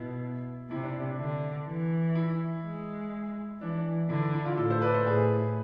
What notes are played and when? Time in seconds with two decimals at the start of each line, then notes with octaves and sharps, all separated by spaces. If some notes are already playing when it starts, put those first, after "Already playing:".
Already playing: B2 E4
0.70 C3 E4
0.83 D4
1.10 D4
1.19 D3
1.67 E3
2.15 E4
2.64 G#3
3.60 E3 D4
4.09 D3 E4
4.34 E4
4.45 D4 F4
4.57 A2 F4 A4
4.70 A4 C5
4.81 B4 D5
4.94 A4 C5
5.06 A2 G#4 B4